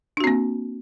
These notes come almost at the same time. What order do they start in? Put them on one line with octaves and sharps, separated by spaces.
D4 F#4 C4 A#3